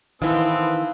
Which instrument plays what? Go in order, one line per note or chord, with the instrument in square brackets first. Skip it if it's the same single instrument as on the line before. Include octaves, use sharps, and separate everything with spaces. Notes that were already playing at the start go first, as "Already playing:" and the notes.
[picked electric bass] D#3 E3 [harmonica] B3 C4 A4 [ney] E4 [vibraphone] F5